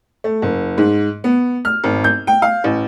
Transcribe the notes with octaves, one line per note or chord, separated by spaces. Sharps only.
A3
F#1
G#2
B3
F6
G#1
G6
G5
F5
A1